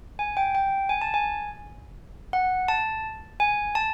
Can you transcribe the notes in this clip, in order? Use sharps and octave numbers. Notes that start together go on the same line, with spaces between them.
G#5
G5
G5
G#5
A5
G#5
F#5
A5
G#5
A5